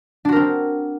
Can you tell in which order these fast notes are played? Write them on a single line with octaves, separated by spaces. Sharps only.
D4 F#4 A#4 C4